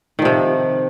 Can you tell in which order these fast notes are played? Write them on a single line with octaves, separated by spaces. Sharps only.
D#3 F3 C3